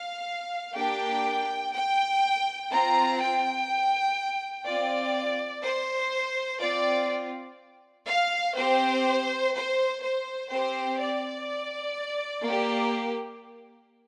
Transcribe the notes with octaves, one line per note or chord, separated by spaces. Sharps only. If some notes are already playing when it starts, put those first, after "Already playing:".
Already playing: F5
A#3 D4 G4 G5
G5
C4 F4 A#5
G5
C4 F4 D5
C5
C4 F4 D5
F5
C4 G4 C5
C5
C5
C4 G4 C5
D5
A#3 G4